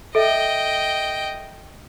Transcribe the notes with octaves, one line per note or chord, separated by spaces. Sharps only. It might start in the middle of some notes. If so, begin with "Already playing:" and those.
A4 D#5 E5 G5